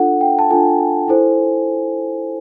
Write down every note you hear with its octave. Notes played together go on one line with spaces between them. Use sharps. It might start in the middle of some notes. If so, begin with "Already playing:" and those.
Already playing: D4 F4 A4 F#5
G5
A5
D4 F4 A4 G#5
E4 A4 C5